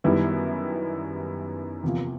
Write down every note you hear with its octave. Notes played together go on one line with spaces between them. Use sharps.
F#2 D#3 G3 B3 E4
E2 C3 F3 A#3